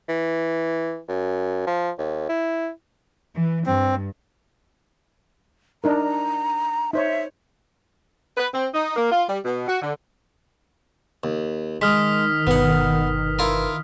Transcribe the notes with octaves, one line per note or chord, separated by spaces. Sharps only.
E3
F#2
F3
D#2
E4
E3
G2 C4
D4 D#4 A#4 A#5
D#4 C5 C#5 E5
B4
C4
D#4
A#3
F4
G3
B2
F#4
D3
D#2
D#3 G#3 D#6 F6 B6
G1 B2 B3 B4 F#5
E4 F4 A#4